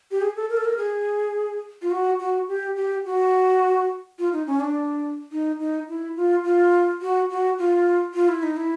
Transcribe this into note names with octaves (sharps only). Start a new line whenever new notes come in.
G4
G#4
A4
A#4
A4
A#4
G#4
F4
F#4
F#4
G4
G4
F#4
F4
D#4
C#4
D4
D#4
D#4
E4
F4
F4
F#4
F#4
F4
F4
E4
D#4
E4